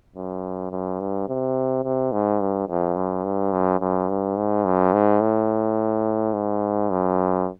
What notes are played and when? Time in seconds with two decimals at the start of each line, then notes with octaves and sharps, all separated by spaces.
0.16 F#2
0.71 F#2
1.00 G2
1.28 C3
1.84 C3
2.12 G#2
2.40 G2
2.68 F2
2.96 F#2
3.24 G2
3.52 F#2
3.80 F#2
4.09 G2
4.37 G#2
4.65 F#2
4.93 G#2
5.21 A2
6.33 G#2
6.90 F#2